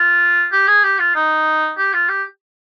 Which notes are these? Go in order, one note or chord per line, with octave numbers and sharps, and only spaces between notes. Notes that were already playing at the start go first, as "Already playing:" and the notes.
Already playing: F4
G4
G#4
G4
F4
D#4
G4
F4
G4